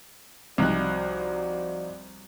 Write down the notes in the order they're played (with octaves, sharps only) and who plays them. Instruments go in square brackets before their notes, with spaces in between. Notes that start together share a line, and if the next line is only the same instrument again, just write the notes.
[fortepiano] C2 [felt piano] F3 D#4 F#6 [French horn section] F#4 C5 D5